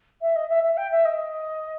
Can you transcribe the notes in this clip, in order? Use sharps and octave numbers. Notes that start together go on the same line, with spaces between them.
E5
D#5
E5
E5
G5
E5
D#5